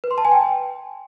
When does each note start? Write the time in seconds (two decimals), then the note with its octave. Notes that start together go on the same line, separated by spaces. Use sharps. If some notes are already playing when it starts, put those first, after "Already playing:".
0.04 B4
0.11 C6
0.18 A5
0.25 G#5
0.32 G5